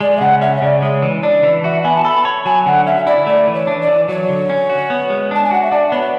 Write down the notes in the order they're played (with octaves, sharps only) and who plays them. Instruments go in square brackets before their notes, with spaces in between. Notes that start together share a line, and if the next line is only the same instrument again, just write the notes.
[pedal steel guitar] G#3 [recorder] D5
[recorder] E5
[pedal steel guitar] C#3 [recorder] F#5
[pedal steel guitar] C#4 [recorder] E5
[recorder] C#5
[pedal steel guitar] C#3 [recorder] D5
[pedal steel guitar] G#3 [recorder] C#5
[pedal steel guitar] E3
[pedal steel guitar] D4 [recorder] D5
[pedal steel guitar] E3
[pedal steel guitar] F#4 [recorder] E5
[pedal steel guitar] B3 [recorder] G#5
[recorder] A5
[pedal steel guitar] A4 [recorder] B5
[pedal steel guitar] C#5
[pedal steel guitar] F#3 [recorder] G#5
[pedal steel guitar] D3 [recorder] F#5
[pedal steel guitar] C#4 [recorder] E5
[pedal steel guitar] E4 [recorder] D5
[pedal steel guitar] A3 [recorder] D5
[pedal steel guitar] E3
[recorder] C#5
[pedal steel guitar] D4
[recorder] D5
[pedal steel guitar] E3
[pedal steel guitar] F#3 [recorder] C#5
[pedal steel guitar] D3
C#4
F#4
B3
G#3
[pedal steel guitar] D4 [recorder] A5
[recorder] G#5
[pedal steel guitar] F#4 [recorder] F#5
[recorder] E5
[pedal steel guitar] D4 [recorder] D5
[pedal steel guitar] B3 [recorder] C#5